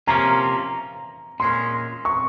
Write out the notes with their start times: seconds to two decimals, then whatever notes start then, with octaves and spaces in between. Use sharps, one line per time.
0.07 C3 F3 A#3 C#4 F4 A#5
1.40 A#2 G#3 C#4 C6
2.05 C#6